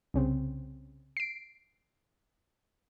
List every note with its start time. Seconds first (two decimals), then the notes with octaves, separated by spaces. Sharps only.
0.14 C2 C#3 C4
1.17 C7 D7